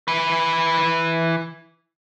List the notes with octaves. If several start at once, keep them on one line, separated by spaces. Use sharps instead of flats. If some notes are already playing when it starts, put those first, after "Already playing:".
E3 B4